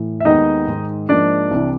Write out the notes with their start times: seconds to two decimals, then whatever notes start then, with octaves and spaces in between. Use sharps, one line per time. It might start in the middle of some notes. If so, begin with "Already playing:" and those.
Already playing: A2 E3
0.20 E5
0.25 D#2 D#3 G#3 B3 D#4 D#5
0.67 G#2 D#3 G#3
1.09 G#2 F3 A#3 D4 D5
1.51 C2 C3 E3